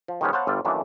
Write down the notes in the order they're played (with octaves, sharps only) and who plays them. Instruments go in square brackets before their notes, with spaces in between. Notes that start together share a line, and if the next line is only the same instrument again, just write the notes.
[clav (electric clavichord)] F3
D#3 F3 G3 G#3 B3 C#4
B3 C5 C#5 F5 F#5 A5
G1 G3 F4 A4 D5
F#2 D#3 E3 A3 A#3 D4